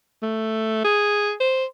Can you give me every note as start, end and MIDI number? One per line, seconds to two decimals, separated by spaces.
0.22 0.83 57
0.84 1.33 68
1.40 1.65 72